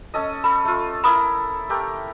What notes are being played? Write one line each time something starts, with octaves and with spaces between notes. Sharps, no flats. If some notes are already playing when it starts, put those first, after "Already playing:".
C#4 A4 D#5
A4 B5
A3 F4
E4 A4 A#4 B5 D#6
A3 G4 A#4